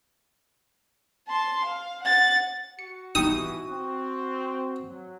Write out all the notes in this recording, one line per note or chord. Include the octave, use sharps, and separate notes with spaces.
A5 C6
F5
F#5 A6
F#4 C#7
B2 E3 D#4 G4 C#6 D#6
C4
F#3